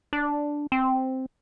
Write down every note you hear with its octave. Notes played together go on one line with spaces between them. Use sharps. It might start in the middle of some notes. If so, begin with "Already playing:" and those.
D4
C4